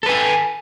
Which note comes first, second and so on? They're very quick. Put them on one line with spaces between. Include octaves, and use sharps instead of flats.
A4 B4 G#5